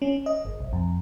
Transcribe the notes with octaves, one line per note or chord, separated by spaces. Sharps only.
C#4
D#5
G1
B1
F2